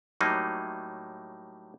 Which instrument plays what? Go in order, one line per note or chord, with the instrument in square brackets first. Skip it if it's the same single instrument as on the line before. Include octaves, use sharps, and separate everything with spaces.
[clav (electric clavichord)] A2 F#3 G3 A#3 D#4